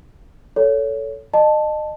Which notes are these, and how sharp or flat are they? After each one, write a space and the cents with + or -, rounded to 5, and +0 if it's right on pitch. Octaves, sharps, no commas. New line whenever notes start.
A4 +0 C#5 +20
D#5 -30 A5 +0